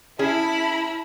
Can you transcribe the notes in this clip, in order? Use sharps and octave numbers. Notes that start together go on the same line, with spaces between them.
C#4 E4 G#4 A5 B5